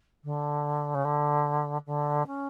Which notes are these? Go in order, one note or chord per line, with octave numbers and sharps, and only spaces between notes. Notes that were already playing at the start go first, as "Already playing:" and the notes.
D3
C#3
D3
D3
C#4